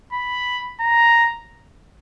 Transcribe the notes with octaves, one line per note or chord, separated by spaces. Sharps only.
B5
A#5